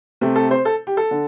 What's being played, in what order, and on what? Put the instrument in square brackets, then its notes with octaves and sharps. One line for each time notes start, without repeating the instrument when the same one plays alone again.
[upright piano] C3 A3 C4
A4
C5
A4
G4
A4
D3